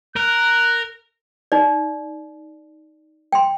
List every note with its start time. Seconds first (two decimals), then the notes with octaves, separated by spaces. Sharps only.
0.16 A#4 F#6
1.52 D#4 D5
3.32 G5 C6